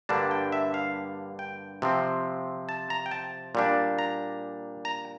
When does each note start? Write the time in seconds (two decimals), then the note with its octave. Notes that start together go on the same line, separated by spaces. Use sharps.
0.09 G2 D3 G3 A#3 D4 A5
0.31 G5
0.52 E5
0.74 F5
1.39 G5
1.82 C3 F3 C4
2.69 A5
2.90 A#5
3.06 G5
3.11 A5
3.55 A#2 G3 D4
3.99 A#5
4.85 A#5